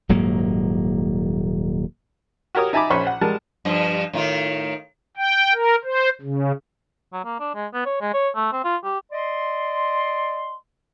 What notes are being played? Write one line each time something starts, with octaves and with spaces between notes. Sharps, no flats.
D#1 G#2 F#3 A#3
F#4 G4 A#4 C#5 D#6
D#4 E5 G#5 A5 B5 D6
A#1 C#4 C5 B5 C#6
F#5
G3 G#3 A#4 A5
G2 F3 D#5
A2 D#3 F4
G5
A#4
C5
C#3
F#3
A#3
D4
G#3
B3
C#5
G#3
C#5
A3
C4
F4
G4
D5 D#5 C6